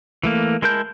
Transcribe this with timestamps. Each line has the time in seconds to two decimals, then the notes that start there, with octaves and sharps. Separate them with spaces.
0.23 E3 A3 A#3
0.62 G#3 E4 A#4 A5 G6